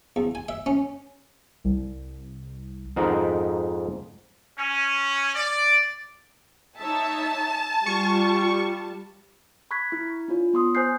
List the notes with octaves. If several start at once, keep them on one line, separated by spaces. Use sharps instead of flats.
E2
G#5
E5
C#4
C2
F2 G#2 D#4 A#4 C5 F#5
C#4
D5
D#4 C#5 E5 A5
G3 F4 C#6
B5 C#6 F#6 G#6 B6
E4
D4 F4 C#5
B3 C6 D#6
C5 G#5 D#6 F#6 G6 C7